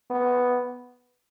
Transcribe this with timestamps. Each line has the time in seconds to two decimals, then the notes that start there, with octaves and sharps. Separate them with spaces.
0.10 B3